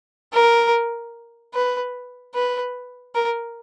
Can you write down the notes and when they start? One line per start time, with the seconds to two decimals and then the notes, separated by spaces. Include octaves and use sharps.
0.34 A#4
1.54 B4
2.35 B4
3.15 A#4